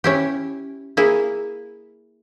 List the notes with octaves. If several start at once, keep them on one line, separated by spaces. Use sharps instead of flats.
C#4 E4 G4
A#3 E4 G#4